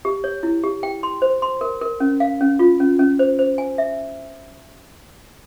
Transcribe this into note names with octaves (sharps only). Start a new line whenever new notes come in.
G4
C#5
E4
G4
G5
C6
C5
C6
A#4
A#4
C#4
F5
C#4
F4
C#4
C#4
C5
C5
G#5
E5